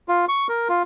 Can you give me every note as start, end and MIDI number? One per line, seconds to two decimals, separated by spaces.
0.09 0.25 65
0.29 0.47 85
0.49 0.68 70
0.69 0.83 65